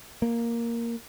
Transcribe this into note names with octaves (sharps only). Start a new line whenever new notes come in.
A#3